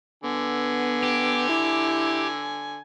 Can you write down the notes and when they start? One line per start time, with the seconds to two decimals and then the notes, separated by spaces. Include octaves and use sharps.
0.24 D3 B3 G#5
1.03 G4
1.49 E4